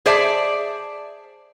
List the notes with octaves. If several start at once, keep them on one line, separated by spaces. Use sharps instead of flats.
G#4 C5 D5 E5 A5